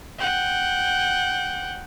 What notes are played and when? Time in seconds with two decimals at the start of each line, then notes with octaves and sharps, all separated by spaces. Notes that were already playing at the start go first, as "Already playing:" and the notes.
0.19 F#5 G5